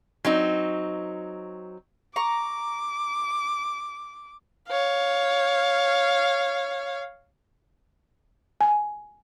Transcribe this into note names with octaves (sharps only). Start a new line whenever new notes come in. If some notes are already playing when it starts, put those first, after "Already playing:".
F#3 C4 D#4
A#5 C#6 D6
C#5 F5
G#5